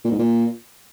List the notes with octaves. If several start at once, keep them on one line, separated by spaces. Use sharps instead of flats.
A#2
G#2
A#2